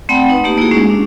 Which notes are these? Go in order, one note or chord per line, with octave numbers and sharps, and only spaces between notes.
A3 C4 D5 F#5 G5 B5
D#4 B4
A3 A#3 D#4 G4
A#3 E4 F#4 G#4
G#3 C#4
D4